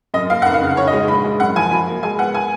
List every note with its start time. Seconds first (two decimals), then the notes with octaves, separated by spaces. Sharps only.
0.14 F#2 D#5
0.30 A#3 F5
0.42 F1 F#5
0.54 F5
0.61 C#3
0.76 G#2 C#5
0.87 D#5
0.93 G#3
1.08 A#1 B5
1.24 G#3
1.40 F#2 F#5
1.56 F3 G#5
1.71 F3 B5
1.87 A#3
2.03 G#3 G#5
2.19 B3 F#5
2.34 G#5